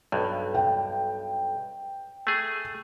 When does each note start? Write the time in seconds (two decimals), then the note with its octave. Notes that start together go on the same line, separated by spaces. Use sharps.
0.12 B1 G2
0.54 G5
2.27 A3 G#4